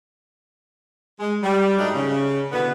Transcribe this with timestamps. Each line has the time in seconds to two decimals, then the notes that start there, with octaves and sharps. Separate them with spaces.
1.19 G#3
1.43 G3
1.78 G#2 F#3 G3 A3 D4 D#4
1.95 C#3
2.52 B2 D3 E3 B3